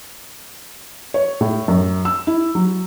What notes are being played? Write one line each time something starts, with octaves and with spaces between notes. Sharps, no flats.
C#5
A2
F#2
E6
E4
F#3